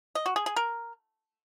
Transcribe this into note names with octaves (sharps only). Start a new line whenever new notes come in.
D#5
F#4
G#4
G#4
A#4